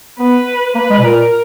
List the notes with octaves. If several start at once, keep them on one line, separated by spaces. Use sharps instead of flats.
B3 B4
A#3 B4
G#3
B2
A#2 A#4